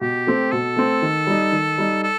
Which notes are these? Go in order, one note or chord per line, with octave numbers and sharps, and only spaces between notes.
B2 G4
A3 C4
B2 A4
A3 C4
D#3
G3 D#4
D#3
G3 D#4
A4